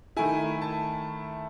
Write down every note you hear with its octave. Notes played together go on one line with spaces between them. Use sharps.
D#3 A3 E4 G#5
A5